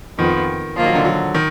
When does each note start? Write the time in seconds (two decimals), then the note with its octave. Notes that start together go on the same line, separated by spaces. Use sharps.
0.18 F2 D#3 F3 B3
0.76 D#3 F3 A#3 F4
0.86 F#3
0.95 D3
1.05 F#3
1.35 D#3